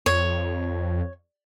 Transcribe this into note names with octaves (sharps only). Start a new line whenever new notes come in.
F2 C#5